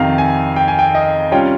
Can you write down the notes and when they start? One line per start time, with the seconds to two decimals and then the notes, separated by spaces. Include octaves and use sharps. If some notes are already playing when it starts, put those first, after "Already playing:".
Already playing: F2 C3 D#3 F5
0.18 G#5
0.56 G5
0.68 G#5
0.79 G5
0.95 D#5
1.32 C3 G3 C#4 F4 G5